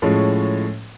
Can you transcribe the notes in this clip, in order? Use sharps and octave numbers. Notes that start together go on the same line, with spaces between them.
A2 F3 G#3 C#4